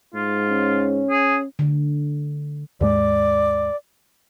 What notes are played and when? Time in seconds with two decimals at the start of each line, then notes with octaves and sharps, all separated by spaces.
0.14 G#2 F4
0.49 C#4
1.10 G#4
1.59 D3
2.81 D#2 G#2 G#3 D5